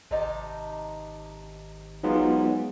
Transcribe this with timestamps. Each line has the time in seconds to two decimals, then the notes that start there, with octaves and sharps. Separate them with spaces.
0.11 G#1 C3 D#4 A5
2.03 G#2 F#3 B3 F4